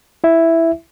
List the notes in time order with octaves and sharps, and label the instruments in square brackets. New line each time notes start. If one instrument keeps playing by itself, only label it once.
[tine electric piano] E4 E5